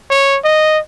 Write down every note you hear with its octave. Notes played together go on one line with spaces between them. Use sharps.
C#5
D#5